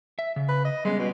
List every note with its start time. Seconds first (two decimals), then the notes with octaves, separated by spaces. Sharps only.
0.19 E5
0.36 C#3
0.49 B4
0.65 D#5
0.85 G3 G#3 B3 C#4
0.99 B2